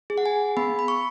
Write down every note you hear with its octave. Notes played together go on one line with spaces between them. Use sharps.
G#4
F#5
G#5
B3 B5
B5
C#6